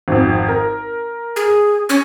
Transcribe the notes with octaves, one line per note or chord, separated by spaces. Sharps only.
G#1 F2
A#4
G#4
C#4